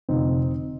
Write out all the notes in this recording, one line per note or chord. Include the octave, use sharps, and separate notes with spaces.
F1 F2 D3 C4 D#4